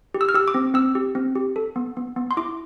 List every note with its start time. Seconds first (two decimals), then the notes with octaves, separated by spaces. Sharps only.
0.14 G4
0.21 E6
0.29 F6
0.34 G4 E6
0.48 D6
0.54 C4
0.74 C4 E6
0.95 G4
1.15 C4
1.35 G4
1.56 A4
1.76 B3
1.97 B3
2.16 B3
2.31 C6
2.37 E4 D6